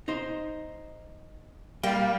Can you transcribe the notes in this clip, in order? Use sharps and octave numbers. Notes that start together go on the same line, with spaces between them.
D#4 C5
G3 A#3 D5 G5